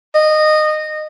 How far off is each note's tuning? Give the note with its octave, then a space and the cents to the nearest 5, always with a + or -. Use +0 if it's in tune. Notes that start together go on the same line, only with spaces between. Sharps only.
D#5 -15